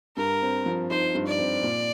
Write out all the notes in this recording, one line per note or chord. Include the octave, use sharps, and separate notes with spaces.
G2 A#4
C4
F3
D#4 C5
G2
D5
C4
A#2